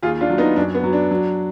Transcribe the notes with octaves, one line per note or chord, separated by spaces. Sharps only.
D#2 F4 G#4
D4 F4
F#3
B3 D#4
F#2 D4
B3
F#3
D4
F#3